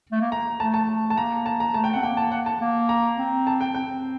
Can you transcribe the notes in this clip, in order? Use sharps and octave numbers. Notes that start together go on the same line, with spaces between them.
A3
A#3
A#5
A3 A5
A5
A5
A#3 A#5
A5
A#5
A3 A5
G5
C4 F#5
A#3 G5
A5
F#5
A5
A#3
A#5
C4
A5
G5
C4 G5